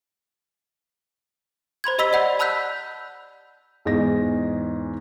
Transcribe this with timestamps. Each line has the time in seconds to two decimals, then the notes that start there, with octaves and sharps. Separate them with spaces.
1.84 C5 B5 C6 G#6
1.98 G4 D#5 B5 E6 B6 G7
2.13 D5 D#5 F#5 B5 G6
2.39 A5 B5 E6 F#6 G6 B6
3.85 E2 G#2 G#3 D#5 A#6